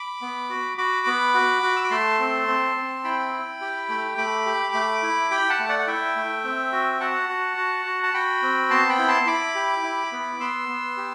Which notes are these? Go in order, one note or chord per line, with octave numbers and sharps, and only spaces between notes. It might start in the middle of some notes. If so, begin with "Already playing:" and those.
Already playing: B5 D6
B3
F#4
F#4 B5 D6
B3
F#4
F#4
E6
D6
A3 A5 C6
C4
C4
C4
E4 G5 B5
E4
G4
A3
A3 B5 D6
G4
A3
E4
G4 G5 B5
F#5 A5
A3
D5 F#5
F#5
E4 E5 G5
A3
C4
F#4
F#4 F#5 A5
F#4
F#4
F#4
A5
F#4 G5 B5
C4
B3 A5 C6
G5 B5
E4
A5 C6
E4 B5 D6
G4
E4
B3
B3 C6 E6
B3
G4